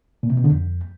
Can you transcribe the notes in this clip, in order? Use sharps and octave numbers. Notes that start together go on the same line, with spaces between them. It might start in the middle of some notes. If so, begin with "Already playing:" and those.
A#2
C3
B2
D3
F2